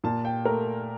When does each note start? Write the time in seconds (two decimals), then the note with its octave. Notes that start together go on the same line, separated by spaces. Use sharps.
0.04 A#2 A5
0.25 G5
0.45 A3 A#4